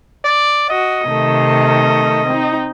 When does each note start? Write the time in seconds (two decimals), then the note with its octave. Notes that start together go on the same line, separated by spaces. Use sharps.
0.25 D5
0.70 F#4 D#5
1.08 C3 D#3 A3
2.29 C4 D#4